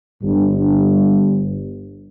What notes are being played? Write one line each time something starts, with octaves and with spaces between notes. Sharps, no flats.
G1 G2